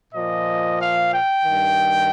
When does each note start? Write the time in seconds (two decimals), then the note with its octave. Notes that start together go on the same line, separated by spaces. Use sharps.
0.11 A#2 F3 D#5
0.78 F5
1.11 G5
1.44 G2 D#3